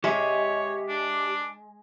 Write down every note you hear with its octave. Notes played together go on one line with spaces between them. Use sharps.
G#3 G4 C#5 E5
D4